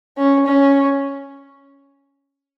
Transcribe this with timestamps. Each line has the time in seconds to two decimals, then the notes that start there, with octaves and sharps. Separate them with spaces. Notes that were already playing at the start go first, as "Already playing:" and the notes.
0.18 C#4
0.46 C#4